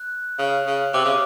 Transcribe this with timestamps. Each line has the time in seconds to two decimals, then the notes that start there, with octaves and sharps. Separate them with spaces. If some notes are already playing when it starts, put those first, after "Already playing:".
Already playing: F#6
0.39 C#3
0.66 C#3
0.94 C3 D6
1.05 C#3